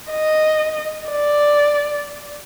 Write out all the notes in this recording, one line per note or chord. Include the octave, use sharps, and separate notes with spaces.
D#5
D5